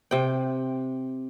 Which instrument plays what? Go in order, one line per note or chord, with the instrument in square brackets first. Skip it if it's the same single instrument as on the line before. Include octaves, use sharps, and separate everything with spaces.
[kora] C3 G5